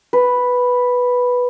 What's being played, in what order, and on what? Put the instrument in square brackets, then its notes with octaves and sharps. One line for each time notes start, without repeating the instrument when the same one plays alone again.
[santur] B4